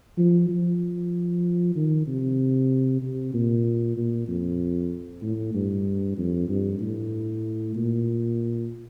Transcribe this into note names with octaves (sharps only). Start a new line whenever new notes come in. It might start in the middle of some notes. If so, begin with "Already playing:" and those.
F3
F3
D#3
C3
C3
A#2
A#2
F2
A2
G2
F2
G2
A2
A#2